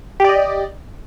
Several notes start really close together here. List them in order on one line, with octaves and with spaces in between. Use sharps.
G4 D5 D#5